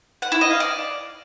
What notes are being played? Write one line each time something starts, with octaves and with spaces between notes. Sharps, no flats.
F#5
E4
D#5
F5
D5